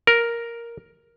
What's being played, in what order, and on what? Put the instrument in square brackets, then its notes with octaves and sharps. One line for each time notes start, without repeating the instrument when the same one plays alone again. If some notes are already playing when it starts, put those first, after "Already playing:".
[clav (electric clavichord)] A#4